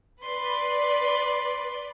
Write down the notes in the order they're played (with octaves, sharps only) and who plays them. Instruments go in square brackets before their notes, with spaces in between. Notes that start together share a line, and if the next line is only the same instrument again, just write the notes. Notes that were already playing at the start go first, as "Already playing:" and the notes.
[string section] B4 D5 [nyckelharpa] C6